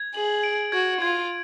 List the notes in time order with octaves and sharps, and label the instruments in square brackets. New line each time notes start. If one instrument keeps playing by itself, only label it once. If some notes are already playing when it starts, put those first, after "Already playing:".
Already playing: [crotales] G#6
[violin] G#4 [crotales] F#7
[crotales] D7
[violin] F#4 [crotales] G#6
[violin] F4 [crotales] G#6